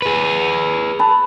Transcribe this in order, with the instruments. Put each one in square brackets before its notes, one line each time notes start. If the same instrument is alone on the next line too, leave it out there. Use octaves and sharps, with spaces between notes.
[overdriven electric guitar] G#4 B4
[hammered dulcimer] B4 A5